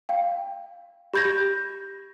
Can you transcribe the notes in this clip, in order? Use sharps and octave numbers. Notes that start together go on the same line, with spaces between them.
F5 G5
G4 B5 G6 G#6 A#6